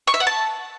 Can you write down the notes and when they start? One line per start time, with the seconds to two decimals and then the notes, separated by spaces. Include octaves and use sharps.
0.07 C#6
0.14 E5
0.20 F#5
0.27 A5